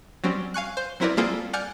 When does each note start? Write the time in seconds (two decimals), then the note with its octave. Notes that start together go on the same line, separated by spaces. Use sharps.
0.24 F#3 G3 C4 C#4
0.54 F5 G#5 C#6 F#6
0.77 C5
1.00 F#3 C4 E4 A#4 B4 D5
1.17 G3 A#3 C4 F4 G#4 A4
1.53 D5 F#5 G#5 F6 G6 C#7